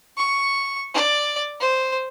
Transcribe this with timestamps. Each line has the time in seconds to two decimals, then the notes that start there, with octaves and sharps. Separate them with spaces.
0.17 C#6
0.94 D5
1.60 C5